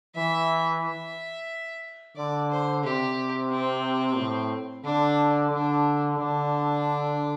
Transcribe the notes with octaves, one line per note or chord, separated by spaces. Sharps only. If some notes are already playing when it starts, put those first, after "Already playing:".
E3 E5
E5
D3 D5
C5
C3 G4
C4
A2
D3 D4
D3 D4
D3 D4